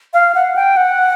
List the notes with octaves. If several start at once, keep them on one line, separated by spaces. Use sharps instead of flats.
F5
F#5
G5
F#5